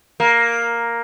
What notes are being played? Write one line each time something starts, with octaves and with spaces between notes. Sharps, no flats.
A#3